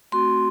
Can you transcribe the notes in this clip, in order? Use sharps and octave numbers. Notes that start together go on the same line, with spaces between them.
A3 C4 F#4 C6